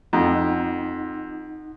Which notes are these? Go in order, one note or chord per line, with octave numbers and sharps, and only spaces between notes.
F2 D#4 F#5